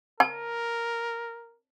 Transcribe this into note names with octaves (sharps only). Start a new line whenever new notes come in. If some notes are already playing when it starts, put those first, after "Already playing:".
A#4 A5